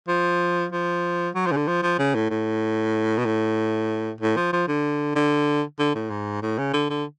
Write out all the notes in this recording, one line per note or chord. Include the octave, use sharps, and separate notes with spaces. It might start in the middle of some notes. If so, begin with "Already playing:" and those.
F3
F3
F#3
F3
C#3
D3
F3
F3
C#3
A2
A2
B2
A2
A2
F3
F3
D3
D3
D3
A2
G#2
A2
C#3
D3
D3